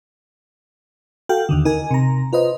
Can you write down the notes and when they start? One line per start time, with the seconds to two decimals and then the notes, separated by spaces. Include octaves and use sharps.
1.29 F#4 A4 F5 G5
1.49 D#2 D3 D#3
1.65 D#4 A#4 G#5
1.91 C3 A#5
2.33 F4 B4 C5 D#5